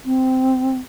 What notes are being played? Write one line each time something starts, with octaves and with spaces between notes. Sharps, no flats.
C4